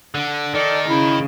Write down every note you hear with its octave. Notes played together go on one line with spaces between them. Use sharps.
D3
D#3 A4 D5
C#3 E4